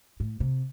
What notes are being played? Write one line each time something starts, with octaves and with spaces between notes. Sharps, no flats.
A2
C3